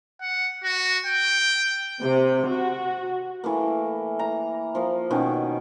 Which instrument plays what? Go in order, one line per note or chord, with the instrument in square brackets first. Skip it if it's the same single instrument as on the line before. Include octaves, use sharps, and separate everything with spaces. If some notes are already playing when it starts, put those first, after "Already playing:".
[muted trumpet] F#5
F#4
G5
[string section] C3
F#4
[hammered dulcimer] E3 A3 A#3
A#5
F3 A#3
B2 D#3 C#4